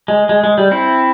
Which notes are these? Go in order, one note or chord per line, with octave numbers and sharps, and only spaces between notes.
G#3
G#3
G#3
G3
C4 E4